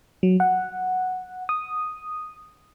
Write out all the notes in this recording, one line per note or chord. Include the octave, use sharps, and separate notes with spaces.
F#3
F#5
D#6